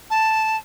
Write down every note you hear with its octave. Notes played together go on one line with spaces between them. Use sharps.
A5